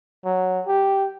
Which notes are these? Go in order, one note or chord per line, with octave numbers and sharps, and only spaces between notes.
F#3
G4